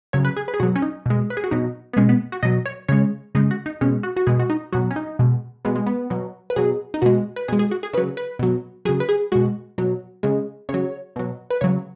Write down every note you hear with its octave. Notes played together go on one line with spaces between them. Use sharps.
C#3 F#3 C#5
B4
G#4
B4
G#4
B2 F#3 F#4
C#4
D#4
B2 G#3
B4
G#4
F#4
B2 F#3 D#4
B3
B2 G#3 C#4
B3
F#4
B2 F#3 D#5
C#5
C#3 G#3 C#5
C#3 G#3 D#4
F#4
D#4
B2 G#3 C#4
F#4
F#4
B2 G#3 G#4
F#4
D#4
B2 F#3 F#4
C#4
D#4
B2 G#3
B2 G#3 B3
G#3
B3
B2 F#3
B4
B2 F#3 G#4
D#4
B2 G#3 F#4
B4
B2 G#3 G#4
G#4
F#4
G#4
C#3 F#3 B4
B4
B2 F#3
C#3 F#3 G#4
B4
G#4
B2 G#3 F#4
B2 F#3
C#3 G#3
C#3 C#5
F#3
B2 F#3
B4
C#3 F#3 C#5